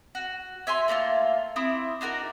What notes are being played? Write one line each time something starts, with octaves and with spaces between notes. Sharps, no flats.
F#4
C#5 E5 G#5 C6
A3 A#3 D4 F4
C4 E4 D6 D#6
D4 D#4 F#4 A#4